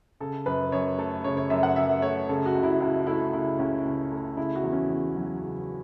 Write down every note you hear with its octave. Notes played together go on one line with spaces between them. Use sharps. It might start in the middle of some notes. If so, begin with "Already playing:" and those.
C#3 A4
F#2 B4
F#2 C#5
A3 A4
C#3 C#5
C#5
F#2 E5
F#5
F#2 E5
A3 C#5
C#3 A4
F#4
C#2
E4
C#2 E4
A3 E4
C#3 E4
C#2 C#4
C#2
A3
C#3 E4
F#4
E2
C#4
E2
F#3
C#3